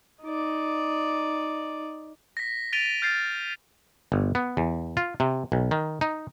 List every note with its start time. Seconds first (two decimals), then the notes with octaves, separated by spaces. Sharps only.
0.23 D#4 D5
2.37 A#6 B6
2.73 A6 B6 D7 D#7 F7 G7
3.02 F6 G6 A6 C7
4.12 G1
4.35 B3
4.57 E2
4.97 F4
5.20 C3
5.52 B1
5.71 D#3
6.01 D#4